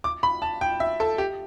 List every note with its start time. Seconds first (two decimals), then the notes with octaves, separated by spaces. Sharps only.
0.04 D6
0.23 B5
0.42 A5
0.61 G5
0.80 E5
1.00 A4
1.18 G4